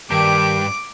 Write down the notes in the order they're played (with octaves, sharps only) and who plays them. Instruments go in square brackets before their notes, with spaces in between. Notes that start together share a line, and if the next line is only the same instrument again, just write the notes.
[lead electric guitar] G2 [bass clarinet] D#3 [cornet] G4 [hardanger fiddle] D6